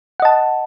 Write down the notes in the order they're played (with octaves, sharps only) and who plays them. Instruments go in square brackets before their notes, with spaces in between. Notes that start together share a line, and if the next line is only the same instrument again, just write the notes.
[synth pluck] F#5
D#5
A5